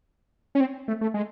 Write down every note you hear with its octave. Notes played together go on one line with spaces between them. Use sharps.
C#4
C4
A3
A3
G#3